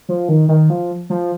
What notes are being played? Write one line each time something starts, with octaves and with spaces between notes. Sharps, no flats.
F3
D#3
D#3
F3
F3